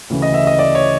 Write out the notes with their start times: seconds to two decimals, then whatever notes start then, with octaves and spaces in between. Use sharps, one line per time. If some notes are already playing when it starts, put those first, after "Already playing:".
0.10 D2 C#3 E3
0.22 D#5
0.34 E5
0.47 D#5
0.59 D5
0.75 C#5